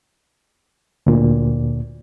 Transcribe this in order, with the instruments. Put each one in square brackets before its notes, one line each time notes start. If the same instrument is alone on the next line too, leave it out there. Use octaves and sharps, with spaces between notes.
[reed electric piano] D2 A#2